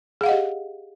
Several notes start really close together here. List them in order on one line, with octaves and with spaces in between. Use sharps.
G#4 F5 F#5 D#5 G4